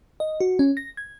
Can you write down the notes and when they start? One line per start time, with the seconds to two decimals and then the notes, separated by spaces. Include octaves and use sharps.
0.20 D#5
0.40 F#4
0.59 C#4
0.77 A#6
0.97 G#6